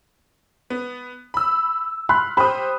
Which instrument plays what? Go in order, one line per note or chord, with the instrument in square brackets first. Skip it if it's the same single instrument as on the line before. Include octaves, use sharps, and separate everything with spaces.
[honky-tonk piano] B3
B5 E6
[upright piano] B5 C6 F#6 [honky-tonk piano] F6
[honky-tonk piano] G4 C5 [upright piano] B5 D#6